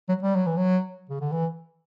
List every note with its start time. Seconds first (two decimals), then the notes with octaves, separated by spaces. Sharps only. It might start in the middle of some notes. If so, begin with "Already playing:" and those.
0.09 F#3
0.23 G3
0.35 F#3
0.46 E3
0.57 F#3
1.10 C#3
1.21 D3
1.32 E3